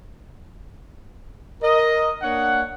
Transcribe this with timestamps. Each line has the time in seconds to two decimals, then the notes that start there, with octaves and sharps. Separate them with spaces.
1.62 A#4 D#5
2.22 A#3 D4 C#5 F#5